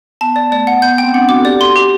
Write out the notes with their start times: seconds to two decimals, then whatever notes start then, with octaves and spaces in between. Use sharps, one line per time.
0.21 B3 A5
0.36 D5
0.52 A3 D5
0.67 A3 F#5
0.82 B3 G6
0.93 B3
0.98 G5
1.04 C4
1.14 D4 F#5
1.29 F#4 D6
1.39 A4
1.45 G4 D5
1.60 A4 C6
1.76 G4